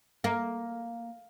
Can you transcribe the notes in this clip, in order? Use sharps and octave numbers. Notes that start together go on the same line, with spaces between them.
A#3